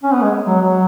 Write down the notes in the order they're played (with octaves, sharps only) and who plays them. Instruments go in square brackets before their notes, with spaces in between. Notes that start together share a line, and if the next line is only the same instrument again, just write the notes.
[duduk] C#4
B3
G#3
F#3
F#3